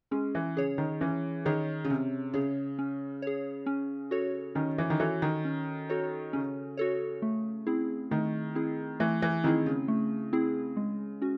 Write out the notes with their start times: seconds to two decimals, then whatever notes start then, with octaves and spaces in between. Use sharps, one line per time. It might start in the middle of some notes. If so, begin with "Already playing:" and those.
0.11 G#3 C#4
0.35 E3
0.57 C#3 G#4 C#5
0.78 D#3
1.01 E3 C#4
1.45 D#3 G#4 C#5
1.84 C#3
1.90 C3 C#4
2.34 C#3 G#4 C#5
2.79 C#4
3.22 G#4 C#5
3.66 C#4
4.11 F#4 A4 C#5
4.55 D#3 C#4
4.78 E3
4.90 D#3
5.00 E3 F#4 A4 C#5
5.22 D#3
5.45 C#4
5.89 F#4 A4 C#5
6.33 C#3 C#4
6.77 F#4 A4 C#5
7.22 A3
7.67 C4 E4 G#4
8.11 D#3 A3
8.55 C4 E4 G#4
9.00 E3 A3
9.22 E3
9.44 D#3 C4 E4 G#4
9.66 C#3
9.88 A3
10.33 C4 E4 G#4
10.77 G#3
11.22 C#4 F#4